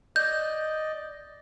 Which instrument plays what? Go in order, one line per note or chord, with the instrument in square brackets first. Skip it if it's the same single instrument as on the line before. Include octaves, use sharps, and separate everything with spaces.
[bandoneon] D5 D#5 [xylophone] G6